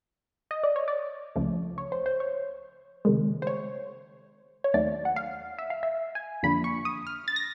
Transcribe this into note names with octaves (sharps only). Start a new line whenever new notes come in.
D#5
D5
C#5
D5
C#2 C#3 F3 A3
C#5
C5
C5
C#5
C#2 C3 D#3 G#3
C5
C#5
C#5
D#2 D#3 F#3 A3 D5
F#5
F5
E5
F5
E5
G#5
F2 D3 F3 A#3 D4 B5
C#6
D#6
F6
A6
A#6